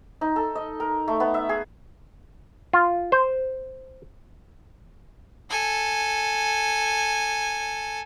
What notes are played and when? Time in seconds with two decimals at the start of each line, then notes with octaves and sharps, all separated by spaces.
0.21 D#4
0.36 A4
0.55 D#5
0.80 A#4
1.08 A3
1.20 B3
1.34 E5
1.49 G#4
2.73 F4
3.12 C5
5.50 A4 G#5